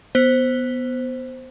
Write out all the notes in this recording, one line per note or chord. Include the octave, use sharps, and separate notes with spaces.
B3 C5